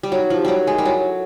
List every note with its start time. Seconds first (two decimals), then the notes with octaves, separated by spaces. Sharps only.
0.03 G3
0.12 F#3 D#4
0.30 F3
0.36 G4
0.45 F#3 G3
0.61 A#4
0.67 G#3
0.78 G3
0.85 F#3 E4
1.10 A4